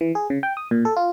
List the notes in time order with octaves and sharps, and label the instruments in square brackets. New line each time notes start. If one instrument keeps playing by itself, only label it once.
[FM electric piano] E3
G#4
C#3
G5
D#6
A#2
A4
F4